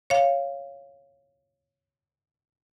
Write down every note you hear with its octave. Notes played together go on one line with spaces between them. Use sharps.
C#5 F5